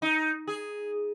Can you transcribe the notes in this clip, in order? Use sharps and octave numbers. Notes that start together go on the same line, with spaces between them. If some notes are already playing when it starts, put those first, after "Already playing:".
D#4
G#4